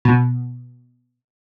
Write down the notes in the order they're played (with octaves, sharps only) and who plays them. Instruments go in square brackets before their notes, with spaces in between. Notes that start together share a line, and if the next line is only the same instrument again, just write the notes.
[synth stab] B2